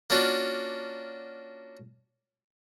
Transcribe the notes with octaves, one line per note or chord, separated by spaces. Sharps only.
A#3 C#4 D4 F4 F#4